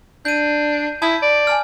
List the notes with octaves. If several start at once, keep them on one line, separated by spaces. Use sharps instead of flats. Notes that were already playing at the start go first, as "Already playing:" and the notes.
D4 G6 D#7
E4 A5 D#6 G#6
D5
G#5 A5 F6